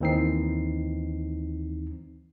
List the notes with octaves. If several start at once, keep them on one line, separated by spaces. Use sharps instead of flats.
D#2 E3 C4 D#4 C7